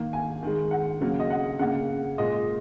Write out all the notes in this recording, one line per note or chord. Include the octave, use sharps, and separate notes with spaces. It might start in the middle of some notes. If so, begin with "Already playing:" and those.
Already playing: D#3 A#3
G#5
D#3 G#3
F#5
C#3 F#3 A#3
D#5
F#5
C#3 A#3 F#5
A#2 G#3 D#5